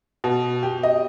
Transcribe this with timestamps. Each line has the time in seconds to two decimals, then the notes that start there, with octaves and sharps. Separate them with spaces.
0.24 B2
0.63 G4
0.83 D#5